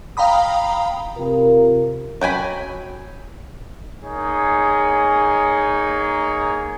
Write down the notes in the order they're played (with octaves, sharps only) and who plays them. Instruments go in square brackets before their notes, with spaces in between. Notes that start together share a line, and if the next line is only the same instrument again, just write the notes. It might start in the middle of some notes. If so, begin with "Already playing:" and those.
[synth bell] F5 G5 A#5 B5 D#6
[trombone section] C3 F4 A#4
[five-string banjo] F#3 G5 G#5 B5
[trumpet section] A#3 D#4 G#4 C#5